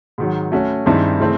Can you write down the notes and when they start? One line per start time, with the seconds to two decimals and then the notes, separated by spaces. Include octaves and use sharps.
0.18 G#2 D#3 F#3
0.52 A3 C#4 F#4
0.86 G2 D#3 G#3 C4 E4
1.20 C#3 E3 A3 C4